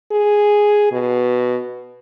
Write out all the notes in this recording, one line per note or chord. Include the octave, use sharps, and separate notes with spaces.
G#4
B2